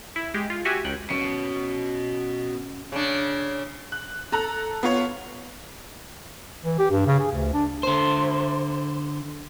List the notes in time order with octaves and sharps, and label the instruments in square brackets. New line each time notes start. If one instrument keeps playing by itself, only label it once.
[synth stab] E4
G#3 G4
F4
F#4 G4 E5 G#5
C#2 G5 F#6
[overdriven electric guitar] B2 [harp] C#4
[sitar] C#3 D4
[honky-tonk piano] F#6
A4 A5 A#5 F#6
B3 F4 C#5
[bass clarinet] E3
G4
G2
C#3
G#4
D2
D4
[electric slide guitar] D3 C5